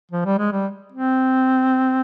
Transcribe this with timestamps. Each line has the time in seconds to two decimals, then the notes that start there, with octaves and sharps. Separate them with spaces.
0.11 F3
0.25 G3
0.38 G#3
0.52 G3
0.92 C4